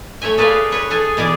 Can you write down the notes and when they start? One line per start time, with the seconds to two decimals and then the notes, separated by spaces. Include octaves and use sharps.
0.22 A3 C#5 E5 G#5
0.38 G#4 A4 B4 D5 E5 F5
0.72 B4 C#5
0.90 G#4 A4 G#5
1.17 B2 E3 G#4 D5